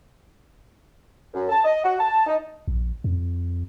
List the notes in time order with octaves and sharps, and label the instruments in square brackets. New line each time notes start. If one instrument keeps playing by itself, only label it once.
[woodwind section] F#2
A5
D#5
F#4
A5
D#4
[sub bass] A#1
F2